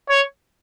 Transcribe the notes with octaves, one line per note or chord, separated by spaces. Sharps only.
C#5